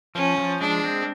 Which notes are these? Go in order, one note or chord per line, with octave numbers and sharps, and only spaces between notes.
F3 C#4
F3
G#3 D4
C4